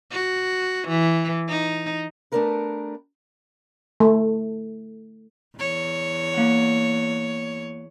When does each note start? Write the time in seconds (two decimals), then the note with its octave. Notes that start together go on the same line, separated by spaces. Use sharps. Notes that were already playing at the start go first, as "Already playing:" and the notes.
0.12 F#4
0.88 E3
1.48 D#4
2.32 A3 B3 D4 G4 A#4 B4
4.00 A3
5.58 E2 C#5
6.34 A#3 F#5